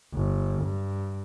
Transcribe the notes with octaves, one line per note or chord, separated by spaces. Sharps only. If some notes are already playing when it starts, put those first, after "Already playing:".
G1
G2